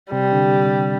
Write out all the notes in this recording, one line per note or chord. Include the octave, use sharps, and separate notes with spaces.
C3 G3 C4
D3 D4